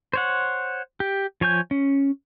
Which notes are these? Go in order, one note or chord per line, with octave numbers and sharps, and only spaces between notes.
C5 C#5 F#5
G4
F3 C#5 G#5 G6
C#4